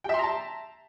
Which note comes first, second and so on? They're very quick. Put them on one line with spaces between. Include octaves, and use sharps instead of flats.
G5 E5 C6 A#5 A5